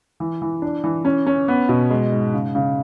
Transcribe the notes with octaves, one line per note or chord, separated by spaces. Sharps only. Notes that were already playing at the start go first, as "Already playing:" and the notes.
E3
E3
D4
E3
C#4
C#4
B3
B2
G#3
G#2
C#3
C#3